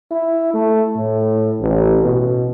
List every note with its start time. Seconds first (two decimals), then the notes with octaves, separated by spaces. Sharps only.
0.11 E4
0.54 A3
0.97 A2
1.61 A1
2.04 B2